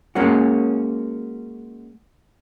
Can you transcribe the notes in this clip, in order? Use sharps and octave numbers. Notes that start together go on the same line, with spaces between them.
G#3 A#3 C#4 F#4